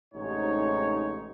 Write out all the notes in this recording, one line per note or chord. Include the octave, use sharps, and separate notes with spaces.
A1 G#2 C3 D#4 C#5